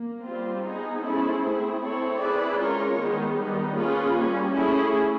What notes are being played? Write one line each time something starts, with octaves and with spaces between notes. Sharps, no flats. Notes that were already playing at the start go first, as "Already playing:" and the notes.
Already playing: A#3
G3 C4 F4
B3 D#4 G#4
G#3 C#4 E4 A4 C5
A3 C4 E4 G#4
C4 E4 A4 C#5
C4 E4 G#4 B4 D5
G#3 C#4 F4 A#4 C#5
D#3 G#3 B3 D#4
D#3 G3 B3 D#4
A#3 C#4 F4 G#4 B4
G3 A#3 C#4
A3 C#4 E4 G#4